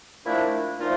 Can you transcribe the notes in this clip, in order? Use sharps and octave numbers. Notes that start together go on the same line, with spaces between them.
A#2 F3 A3 D4 E4
A#2 F3 A3 D#4 F4